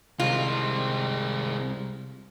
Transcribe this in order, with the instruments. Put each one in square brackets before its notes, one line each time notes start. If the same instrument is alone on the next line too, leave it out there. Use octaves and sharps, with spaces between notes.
[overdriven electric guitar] C2 [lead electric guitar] G#3 C4 [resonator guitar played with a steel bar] F4